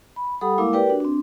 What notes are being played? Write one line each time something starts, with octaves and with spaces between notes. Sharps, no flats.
B5
G3 G4 A4 F#5 B5 D#6
G#3 A#3 E4 A#4 F5 D6
G4 A#4 B4 D5 G5
D4 F#4
C4 D4